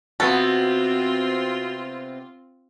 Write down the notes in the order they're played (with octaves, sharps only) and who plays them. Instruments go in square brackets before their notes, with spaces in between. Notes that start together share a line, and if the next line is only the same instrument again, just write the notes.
[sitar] C3 B3 [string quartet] C4 F4 [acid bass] F#4 [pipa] A4